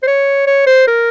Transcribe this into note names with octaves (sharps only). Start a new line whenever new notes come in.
C5
C#5
C#5
C5
A#4